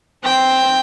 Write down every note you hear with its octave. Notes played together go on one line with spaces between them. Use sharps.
C4 G5